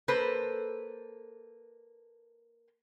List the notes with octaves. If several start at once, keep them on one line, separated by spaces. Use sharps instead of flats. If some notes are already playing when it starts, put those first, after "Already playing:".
A#3 A4 B4 C5